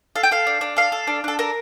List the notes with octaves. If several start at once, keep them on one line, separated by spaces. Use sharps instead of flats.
A4 F5
G5
A4 F5
D4
D4
A4 F5
A4
D4
D4 A4
A4 A#4